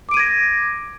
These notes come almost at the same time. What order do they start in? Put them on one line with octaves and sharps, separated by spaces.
D6 D7 D#7 G#6 A#6